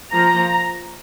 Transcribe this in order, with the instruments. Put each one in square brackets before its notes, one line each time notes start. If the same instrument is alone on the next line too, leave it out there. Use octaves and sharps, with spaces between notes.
[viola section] F3 A#3 A#5